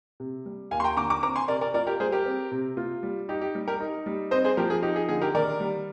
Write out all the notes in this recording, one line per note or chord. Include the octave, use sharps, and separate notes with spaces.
C3
G3
D#2 F5 G#5
C6
G5 A#5
D3 A#5 D6
A#5 D6
C4 A#5 D6
G#5 C6
C3 A#4 D5
A#4 D5
F4 A#4 D5
G4 A#4
G3 G#4 C5
G4 A#4
C4
C3
F4
G3
D#4 G4
G4
G3
G4 A#4
D#4
G3
C4 C5 D#5
G#4 C5
F3 G4 A#4
G#4
D#4 G4
G#4
D3 G#4
G4 A#4
D#3 A#4 D5
G3